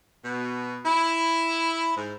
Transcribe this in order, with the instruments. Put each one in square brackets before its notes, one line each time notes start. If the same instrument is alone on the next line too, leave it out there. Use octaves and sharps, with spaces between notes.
[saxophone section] B2
E4
G#2